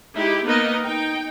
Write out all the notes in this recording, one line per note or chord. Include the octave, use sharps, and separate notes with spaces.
G#3 D#4 E4 G4
A#3 B3 D#4 A#4 B4 D#5
D#4 G5